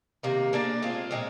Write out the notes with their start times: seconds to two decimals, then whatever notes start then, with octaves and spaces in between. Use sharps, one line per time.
0.23 C3 D#3 A#3
0.53 A#3 D4 G#4 D5
0.82 G#3 C4 F4
1.11 A#2 G#3 C4